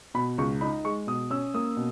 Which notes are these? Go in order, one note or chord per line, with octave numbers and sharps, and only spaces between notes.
B2 B5
C#2 C#6
D#4 B5
G#3 C#6
B2 D#6
C#4 E6
A#3 D#6
B2